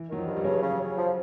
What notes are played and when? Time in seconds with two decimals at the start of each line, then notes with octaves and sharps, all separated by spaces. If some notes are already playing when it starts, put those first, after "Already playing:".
Already playing: E3
0.10 D#3 F#3
0.18 F3
0.27 G2
0.37 G3
0.44 C#3 F#3
0.62 C#3
0.71 G3
0.80 C#3
0.97 F3